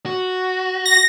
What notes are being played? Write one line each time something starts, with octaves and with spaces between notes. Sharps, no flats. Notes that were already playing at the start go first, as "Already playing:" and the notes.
F#4
A#6